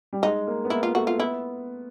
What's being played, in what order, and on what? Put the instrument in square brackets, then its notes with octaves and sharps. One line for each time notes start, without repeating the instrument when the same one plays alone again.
[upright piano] G3
[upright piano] G#3 [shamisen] D#4
[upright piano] A#3
B3
[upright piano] A#3 [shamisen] E4
[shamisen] F4
[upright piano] A3 [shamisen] F#4
[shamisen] F4
[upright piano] B3 [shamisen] E4